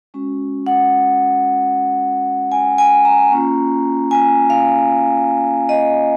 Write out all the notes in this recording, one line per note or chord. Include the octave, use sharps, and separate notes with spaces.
G#3 C#4 F#4
F#5
G#5
G#5
A#5
A#3 C#4 F4
G#5
F5
D#5